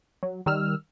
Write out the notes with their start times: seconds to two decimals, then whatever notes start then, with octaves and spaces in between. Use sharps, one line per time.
0.23 F#3
0.46 D#3 G3 E6 F6